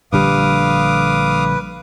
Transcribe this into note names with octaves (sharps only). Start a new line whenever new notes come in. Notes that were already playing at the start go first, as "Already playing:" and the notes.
A#1 D3 G3 B4 F5 D6 D#6